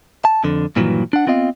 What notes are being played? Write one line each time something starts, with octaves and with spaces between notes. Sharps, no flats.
A5
F2 D3
G2 A#2 D#3 E3 F#3
D4 F#5
B3 C4 F4 D#5 F5